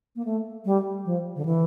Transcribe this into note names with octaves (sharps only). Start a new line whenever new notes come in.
A#3
A3
G3
F3
D3
E3